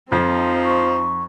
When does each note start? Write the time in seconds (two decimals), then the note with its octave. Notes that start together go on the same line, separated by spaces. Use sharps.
0.12 F2 F3 C4 D#4
0.65 C#6